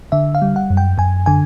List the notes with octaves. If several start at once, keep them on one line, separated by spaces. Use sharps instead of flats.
D3 E5
F5
G3
F#5
F#2
G5
F#2 G#5
D3 G#5